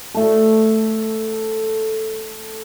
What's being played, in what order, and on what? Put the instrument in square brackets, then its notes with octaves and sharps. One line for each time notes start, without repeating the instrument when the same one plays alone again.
[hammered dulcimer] A3 A4